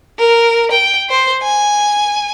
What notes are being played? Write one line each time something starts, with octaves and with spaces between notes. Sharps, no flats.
A#4
G5
C5
G#5